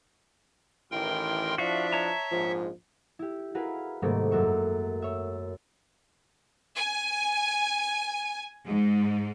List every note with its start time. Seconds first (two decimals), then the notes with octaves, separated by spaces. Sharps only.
0.91 A1 D#3 E3 A#4 G5 C6
1.58 F3 D4 E4 F#4 E5 F5
1.93 C#5 A5 A#5
2.31 A#1 G#2 F3
3.19 E4 G4
3.55 E4 F#4 G#4 A#4 B4 F5
4.02 G#2 C3 D#3 G3 A3 A#3
4.31 F#2 F#4 E5 C#6
5.02 C#5 E5
6.77 G#5
8.66 G#2